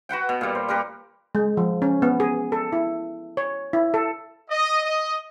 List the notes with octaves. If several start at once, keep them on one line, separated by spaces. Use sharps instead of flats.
F#4 B4 F#5 G5
B2
A#2 G3
C5
G3 G4 A#4 B4
G#3
F3
C#4
B3
G#4
A4
E4
C#5
E4
A4
D#5
D#5